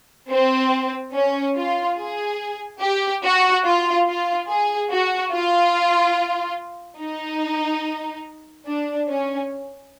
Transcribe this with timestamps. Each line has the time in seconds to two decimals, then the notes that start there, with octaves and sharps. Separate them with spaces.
0.30 C4
1.14 C#4
1.56 F4
1.97 G#4
2.81 G4
3.23 F#4
3.65 F4
4.07 F4
4.48 G#4
4.90 F#4
5.32 F4
6.99 D#4
8.66 D4
9.08 C#4